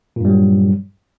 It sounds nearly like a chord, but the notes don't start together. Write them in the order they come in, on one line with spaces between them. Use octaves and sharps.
A#2 G2 G3 F#3